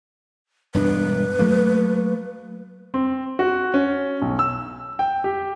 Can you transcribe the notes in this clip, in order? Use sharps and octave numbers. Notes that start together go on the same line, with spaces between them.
E1 G2 D4 B4
F#3 A3 A#3
C4
F#4
C#4
B1
E6
G5
G4